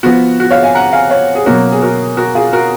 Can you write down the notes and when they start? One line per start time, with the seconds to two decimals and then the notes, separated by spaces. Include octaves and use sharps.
0.03 F3 B3 F#4
0.40 F#4
0.50 C#5 F5
0.63 F5 G#5
0.75 F#5 A#5
0.93 F5 G#5
1.10 C#5 F5
1.35 G#4
1.46 B2 F#3 A#3 C#4 F#4 A#4
1.72 G#4
1.82 F#4 A#4
2.17 F#4 A#4
2.35 F4 G#4
2.53 F#4 A#4